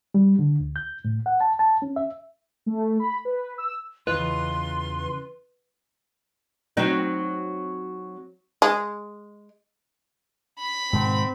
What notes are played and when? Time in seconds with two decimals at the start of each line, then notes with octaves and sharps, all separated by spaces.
0.14 G3
0.39 D3
0.60 D2
0.76 G6
1.05 A2
1.26 F#5
1.40 A5
1.59 A5
1.82 C#4
1.96 E5
2.66 A3
3.00 B5
3.25 B4
3.58 E6
4.07 E2 C#3 E3 F4 B4 D#5 C6
6.77 F#3 C4 D#4
8.62 G#3
10.59 B5
10.93 G#2 B2 D#3 C4